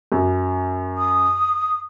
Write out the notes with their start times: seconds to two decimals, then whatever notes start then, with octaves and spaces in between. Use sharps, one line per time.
0.12 F#2
0.98 D#6